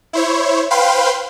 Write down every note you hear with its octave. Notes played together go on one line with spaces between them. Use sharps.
E4 C5 C#5
B4 C5 F5 G5 B5 C6